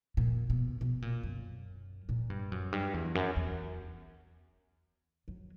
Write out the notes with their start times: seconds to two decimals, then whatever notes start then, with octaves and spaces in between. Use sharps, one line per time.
0.17 A#2
0.50 B2
0.81 B2
1.02 A#2
1.23 F#2
2.09 A#2
2.30 G2
2.52 F#2
2.72 G2
2.94 E2
3.15 F#2
3.36 E2
5.28 F#3